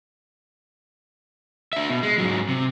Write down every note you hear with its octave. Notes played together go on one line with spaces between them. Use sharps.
D4 E5
B2
G#3
G#2 F#3
C3